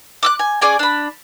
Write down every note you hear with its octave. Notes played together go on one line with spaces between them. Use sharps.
D6 E6 F#6
G#5
C#4 G#4 D5 G#5
D4 B5